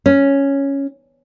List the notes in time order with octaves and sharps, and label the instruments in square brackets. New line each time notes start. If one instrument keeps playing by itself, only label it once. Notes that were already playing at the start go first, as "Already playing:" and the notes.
[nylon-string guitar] C#4